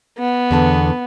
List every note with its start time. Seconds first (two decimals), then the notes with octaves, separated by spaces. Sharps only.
0.18 B3
0.51 E2 D3 A5